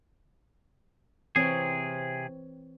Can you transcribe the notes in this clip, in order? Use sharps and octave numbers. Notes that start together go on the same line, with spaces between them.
C3 E3 C4 G#4 C#5